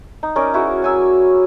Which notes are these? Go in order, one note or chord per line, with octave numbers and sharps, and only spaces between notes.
D#4
C#4 D#4 A#4 D5
E4 F#4 G#4
F#3 G#5 E6